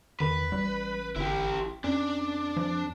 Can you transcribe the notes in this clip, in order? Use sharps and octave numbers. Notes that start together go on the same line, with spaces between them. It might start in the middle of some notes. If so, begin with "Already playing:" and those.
E2 D#3 B4
A1 G3
G1 E4 G4
F2 C#4 D4
F3